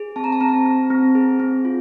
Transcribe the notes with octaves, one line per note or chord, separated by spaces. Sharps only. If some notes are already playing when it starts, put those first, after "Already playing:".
Already playing: G#4
C4 A5
A#5
A5
C4 A#5
A5
C4
C4
G#4
C4
F4